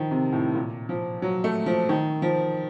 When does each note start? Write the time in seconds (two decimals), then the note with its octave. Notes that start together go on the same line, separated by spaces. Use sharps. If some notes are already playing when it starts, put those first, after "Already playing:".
Already playing: D#3 F3
0.11 C3
0.33 A2
0.55 A#2
0.89 F3
1.22 F#3
1.44 A3
1.66 F3
1.89 D#3
2.22 F3